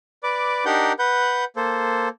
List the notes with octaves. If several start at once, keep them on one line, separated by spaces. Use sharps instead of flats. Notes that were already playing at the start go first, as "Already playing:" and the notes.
B4 D5 D6
D4 D#4 G4 A#4 F#5 G6
B4 F#5 G6
A#3 A4 C5